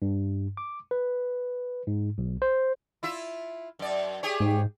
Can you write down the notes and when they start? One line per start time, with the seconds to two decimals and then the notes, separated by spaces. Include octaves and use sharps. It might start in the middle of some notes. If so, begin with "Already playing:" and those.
0.02 G2
0.57 D6
0.91 B4
1.87 G#2
2.18 B1
2.42 C5
3.03 E4 F4 E5
3.79 F#2 D5
4.23 G4 G#4 C#5
4.40 G#2